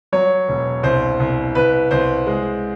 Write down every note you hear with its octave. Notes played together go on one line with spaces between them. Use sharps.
F#3 C#5
E1
C2 C5
C2
C2 B4
C2 C5
G#3